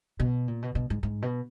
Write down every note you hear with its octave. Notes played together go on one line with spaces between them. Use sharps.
B2
A#2
B2
B2
G#2
G#2
B2